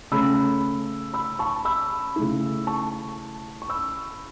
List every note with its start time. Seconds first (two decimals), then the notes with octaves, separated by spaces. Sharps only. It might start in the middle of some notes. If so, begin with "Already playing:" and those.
0.11 C#3 A3 C#4 B5 E6
1.14 B5 E6
1.39 A5 C#6
1.65 B5 E6
2.16 C#3 A3 E4
2.67 A5 C#6
3.62 C#6
3.69 B5 E6